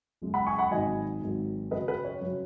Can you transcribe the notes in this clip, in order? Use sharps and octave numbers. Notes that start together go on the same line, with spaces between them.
F#1 F#2 C#3 G#3
F#5 B5
G#5 C#6
F#5 B5
G#1 G#2 D#3 F#3 D#5 G#5
G#1 G#2 D#3 F#3
F#2 C#3 F#3 B4 D#5
B4
C#5
F#2 C#3 F#3